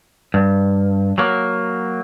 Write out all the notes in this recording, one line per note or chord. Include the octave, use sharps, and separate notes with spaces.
G2
F#3 A#3